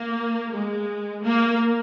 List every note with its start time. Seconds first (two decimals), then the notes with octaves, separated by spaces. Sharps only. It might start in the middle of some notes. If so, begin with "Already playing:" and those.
Already playing: A#3
0.53 G#3
1.23 A#3